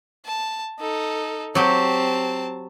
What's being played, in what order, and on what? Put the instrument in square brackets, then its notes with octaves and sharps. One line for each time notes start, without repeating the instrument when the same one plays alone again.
[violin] A5
D#4 A4
[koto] F#3 G4 [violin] C4 A5